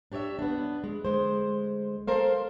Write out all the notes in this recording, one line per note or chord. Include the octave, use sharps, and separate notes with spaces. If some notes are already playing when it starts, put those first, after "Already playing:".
D4 G4 C#5 D5 E5
B3 D4
G#3
D2 G#3 C5
A4 A#4 C5 F5